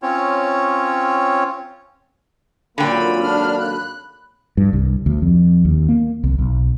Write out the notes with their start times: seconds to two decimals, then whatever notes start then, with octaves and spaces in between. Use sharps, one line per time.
0.02 C4 C#4 F4 C#5
2.78 G#1 A#2 D3 F#3 A#3 G5 B5
3.22 D4 F6
3.60 F#6
4.57 G2
4.73 C2
5.06 D2
5.22 F2
5.65 D#2
5.89 A#3
6.24 C2
6.39 B1